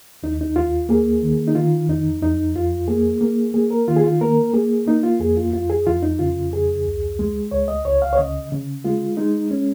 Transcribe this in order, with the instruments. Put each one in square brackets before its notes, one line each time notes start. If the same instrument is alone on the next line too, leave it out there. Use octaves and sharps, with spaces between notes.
[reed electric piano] D#2 D#4
D#4
D#2 F4
A#3 G#4
D#3
D#4
D#3 F4
F2 D#4
F2 D#4
F2 F4
A#3 G#4
A#3
A#3 G#4
A#4
D#3 F4
G#4
F4
A#3 A#4
A#3 G#4
A#3 D#4
F4
F2 G#4
F4
F2 F4
G#4
F2 F4
D#4
C#3 F4
F2 G#4
C#2
G#3
C#2 C#5
D#5
C#2 C#5
F5
C#5
C#3 D#5
C#3
G#3 F4
G#3 D#4
C#4